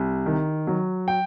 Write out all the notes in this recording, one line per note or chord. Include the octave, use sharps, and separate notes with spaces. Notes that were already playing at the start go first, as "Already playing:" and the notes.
Already playing: C2
D#3
F#3
G5